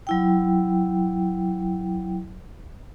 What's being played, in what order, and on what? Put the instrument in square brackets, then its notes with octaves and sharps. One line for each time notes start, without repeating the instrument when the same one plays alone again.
[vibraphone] F#3 E4 G5